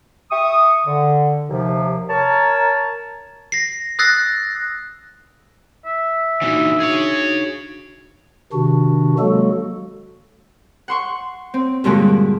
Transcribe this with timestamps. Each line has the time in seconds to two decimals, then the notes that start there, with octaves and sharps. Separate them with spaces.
0.31 E5 G5 C#6 D#6
0.85 D3
1.48 D#2 C3 F3
2.09 A#4 C#5 A5
3.52 A#6 C7
3.99 D#6 E6 F#6 A6 A#6 C7
5.86 E5
6.42 A#2 E3 D4 D#4 F#4
6.80 G#4 C#5
8.53 C3 D#3 D4 F#4
9.19 F#3 G#3 A#3 F#4 A4
10.88 F#5 C6 C#6
11.54 C4
11.84 G2 A#2 D3 G3 G#3 F#4